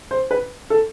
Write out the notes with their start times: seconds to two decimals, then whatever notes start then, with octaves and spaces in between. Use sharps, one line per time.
0.11 C5
0.31 B4
0.70 A4